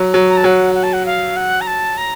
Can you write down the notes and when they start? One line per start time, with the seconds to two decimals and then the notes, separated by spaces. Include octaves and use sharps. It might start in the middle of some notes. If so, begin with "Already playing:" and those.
Already playing: F#3
0.14 F#3
0.30 A#5
0.37 A5
0.44 F#3 F#5
0.75 F#5
0.83 A5
0.93 F#5
1.06 F5
1.36 F#5
1.61 A#5
1.67 A5
1.97 A#5